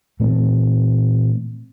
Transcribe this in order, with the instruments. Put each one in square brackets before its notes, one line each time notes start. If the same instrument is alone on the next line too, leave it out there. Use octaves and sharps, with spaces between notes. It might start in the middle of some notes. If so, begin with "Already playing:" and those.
[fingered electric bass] A#2 E3 A3 C4